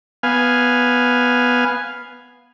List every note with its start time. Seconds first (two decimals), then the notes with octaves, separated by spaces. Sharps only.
0.23 B3 F5 G#5